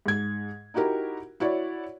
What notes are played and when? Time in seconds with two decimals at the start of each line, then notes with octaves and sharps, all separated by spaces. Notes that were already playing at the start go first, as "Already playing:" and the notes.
0.06 G#2 G#6
0.74 D#4 E4 F#4 G4 A#4
1.40 E4 F#4 C#5 D5